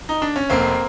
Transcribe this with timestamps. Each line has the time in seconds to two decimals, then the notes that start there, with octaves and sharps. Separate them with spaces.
0.09 D#4
0.22 D4
0.36 C#4
0.50 F1 A#3 C4